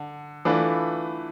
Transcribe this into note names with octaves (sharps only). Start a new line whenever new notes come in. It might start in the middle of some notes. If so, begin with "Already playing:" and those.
Already playing: D3
E3 A3 D4 F4 B4